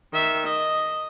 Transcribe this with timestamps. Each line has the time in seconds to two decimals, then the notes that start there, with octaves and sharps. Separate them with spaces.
0.12 D#3 E5
0.47 D#5